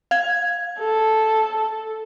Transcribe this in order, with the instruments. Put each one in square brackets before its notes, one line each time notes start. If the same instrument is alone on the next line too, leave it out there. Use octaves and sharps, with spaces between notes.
[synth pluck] F5 G#6
[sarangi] A4